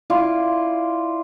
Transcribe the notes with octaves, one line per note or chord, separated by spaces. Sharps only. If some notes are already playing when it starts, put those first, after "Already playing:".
E4 F4 D5